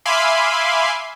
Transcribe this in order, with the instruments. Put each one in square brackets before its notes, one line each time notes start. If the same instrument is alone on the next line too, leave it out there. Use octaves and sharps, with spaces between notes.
[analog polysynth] E5 F5 G#5 B5 C6 D6